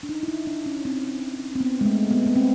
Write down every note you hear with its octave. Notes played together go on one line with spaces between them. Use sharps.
D4
D#4
E4
D#4
D4
C#4
C4
C4
B3
G#3
A3
B3
B3
C4